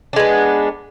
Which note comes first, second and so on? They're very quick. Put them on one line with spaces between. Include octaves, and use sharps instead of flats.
D4 G#3 B3